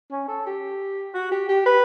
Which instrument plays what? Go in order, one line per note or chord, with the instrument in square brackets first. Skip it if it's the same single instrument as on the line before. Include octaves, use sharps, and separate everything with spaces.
[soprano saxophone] C#4
A4
G4
F#4
G4
G4
B4